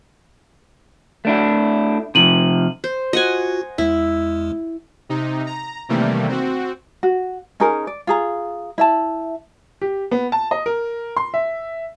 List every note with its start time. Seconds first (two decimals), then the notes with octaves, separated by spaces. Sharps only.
1.25 A3 D4 E4
2.15 C3 F3 D#7 F#7
2.84 C5
3.13 F4 F#4 D#5 F#5 G#5
3.78 E2 G#3 E4
5.09 C3 D#4
5.47 A#5
5.89 C3 D#3 E3 G3 A3 A#3
6.29 C4 F#4
7.03 F#4
7.60 C#4 D#4 G#4 A#4
7.87 D5
8.07 F4 G#4 A#5
8.78 E4 E5 A5
9.82 G4
10.11 B3
10.32 A5
10.51 D#5
10.66 A#4
11.17 C6
11.34 E5